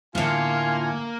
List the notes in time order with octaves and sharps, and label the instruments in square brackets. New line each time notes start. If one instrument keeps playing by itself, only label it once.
[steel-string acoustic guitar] A2 D3 [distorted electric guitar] A#3 [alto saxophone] F4 [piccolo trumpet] G#5